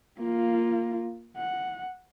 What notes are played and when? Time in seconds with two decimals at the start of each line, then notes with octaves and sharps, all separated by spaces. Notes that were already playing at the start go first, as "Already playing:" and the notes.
0.19 A#3 F4
1.37 F#5